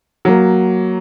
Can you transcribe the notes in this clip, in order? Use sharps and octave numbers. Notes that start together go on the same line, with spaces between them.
F#3 A#3